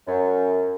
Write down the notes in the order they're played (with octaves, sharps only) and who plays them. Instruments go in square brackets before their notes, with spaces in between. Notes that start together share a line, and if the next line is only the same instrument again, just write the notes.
[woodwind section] F#2